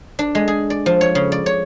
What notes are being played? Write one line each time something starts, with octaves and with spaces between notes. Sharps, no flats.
D4
G#3
G#4
D5
F3
C#5
C#3
D5
C#5